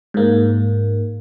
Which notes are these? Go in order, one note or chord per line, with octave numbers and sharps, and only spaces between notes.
G#2 A#3